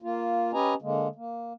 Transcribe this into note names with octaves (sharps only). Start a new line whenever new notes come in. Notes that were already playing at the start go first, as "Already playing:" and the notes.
A#3 F4
C#4 G4 B4 D#5 G#5 A#5
D3 G#3 A#3
A#3